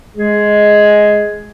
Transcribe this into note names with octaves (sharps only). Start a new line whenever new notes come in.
G#3 G#4